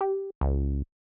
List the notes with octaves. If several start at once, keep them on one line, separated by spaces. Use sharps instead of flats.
G4
C#2